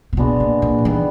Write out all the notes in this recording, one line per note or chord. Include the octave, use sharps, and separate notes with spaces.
C3
B2 G#3 B3 D4 F#4
A#2
A#2
D#3
E3 G3 B3 D#4